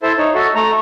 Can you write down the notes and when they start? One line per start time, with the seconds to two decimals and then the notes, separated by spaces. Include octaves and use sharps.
0.03 E4 A4 C5 E5 A5
0.18 D#4 C#5
0.35 F#4 A4 E5
0.55 A3 A#5